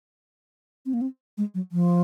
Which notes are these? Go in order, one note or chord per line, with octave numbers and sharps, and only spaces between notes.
C4
A#3
C4
G#3
F#3
F3